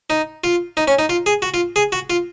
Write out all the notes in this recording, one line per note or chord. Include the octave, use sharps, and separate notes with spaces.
D#4
F4
D#4
C#4
D#4
F4
G#4
F#4
F4
G#4
F#4
F4